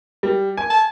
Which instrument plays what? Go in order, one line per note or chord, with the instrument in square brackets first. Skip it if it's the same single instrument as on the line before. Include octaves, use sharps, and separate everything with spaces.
[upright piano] G3
G#5
[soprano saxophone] A5